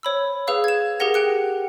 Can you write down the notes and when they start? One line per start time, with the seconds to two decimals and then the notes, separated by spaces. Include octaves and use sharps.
0.03 C5 C#5 B5 E6
0.47 G#4 B4 F5 E6
0.64 G#6 E7
1.00 G4 G#4 A#4 F#5 A#6
1.14 G4 G5 F#6 C#7